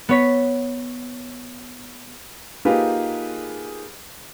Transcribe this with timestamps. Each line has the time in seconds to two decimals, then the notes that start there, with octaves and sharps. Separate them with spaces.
0.09 B3 C#5 B6
2.65 A#3 D#4 F4 G4 G#4 B4